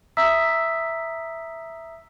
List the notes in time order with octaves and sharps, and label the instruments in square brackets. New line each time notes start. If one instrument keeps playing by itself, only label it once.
[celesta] E5 A#5 D#6 E6 B6